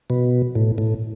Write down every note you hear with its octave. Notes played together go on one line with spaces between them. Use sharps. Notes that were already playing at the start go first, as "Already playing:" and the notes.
B2
A2
A2